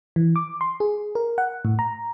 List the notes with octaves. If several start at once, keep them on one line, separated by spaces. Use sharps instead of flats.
E3
D6
C6
G#4
A#4
F#5
A2
A#5